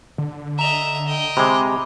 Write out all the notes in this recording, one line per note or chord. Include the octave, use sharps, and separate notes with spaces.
D3
D#5 E5 A#5 F7
D#5 G5
C3 G#3 B5 D6